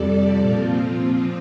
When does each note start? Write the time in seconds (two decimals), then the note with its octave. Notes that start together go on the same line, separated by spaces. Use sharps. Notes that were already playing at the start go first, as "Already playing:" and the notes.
Already playing: F2 C3 G3 A4 D5
0.40 A#2 F3 C4 F4
1.01 F4